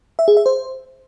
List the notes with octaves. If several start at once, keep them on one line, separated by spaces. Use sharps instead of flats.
E5
G#4
E5
C5